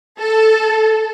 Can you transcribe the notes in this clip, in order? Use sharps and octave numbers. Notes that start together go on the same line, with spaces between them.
A4